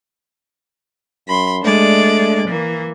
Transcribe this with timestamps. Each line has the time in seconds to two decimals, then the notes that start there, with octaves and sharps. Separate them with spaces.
1.28 F#2 B5 C6
1.64 G#3 A3 D4 D5
2.48 E3 A#3